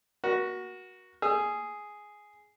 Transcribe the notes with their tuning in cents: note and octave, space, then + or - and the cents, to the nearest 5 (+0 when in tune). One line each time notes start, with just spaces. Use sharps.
F#4 +0 A#4 +35
G#4 +0 E6 +40